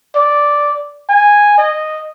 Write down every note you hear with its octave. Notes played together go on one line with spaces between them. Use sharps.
D5
G#5
D#5